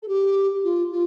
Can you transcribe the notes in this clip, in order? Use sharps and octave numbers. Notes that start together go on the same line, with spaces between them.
A4
G4
F4
F4